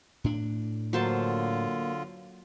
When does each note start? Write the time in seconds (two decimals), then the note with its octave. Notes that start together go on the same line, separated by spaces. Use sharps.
0.24 A2 D4
0.93 D3 F#3 A#3 F4 C5 A5